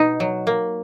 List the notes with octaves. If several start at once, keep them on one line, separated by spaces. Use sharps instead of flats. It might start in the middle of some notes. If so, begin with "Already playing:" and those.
Already playing: B2 D#4
F#3
A#3